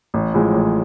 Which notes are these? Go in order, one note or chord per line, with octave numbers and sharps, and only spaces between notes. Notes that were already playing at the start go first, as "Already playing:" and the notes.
A1
A2 F3 G#3
A1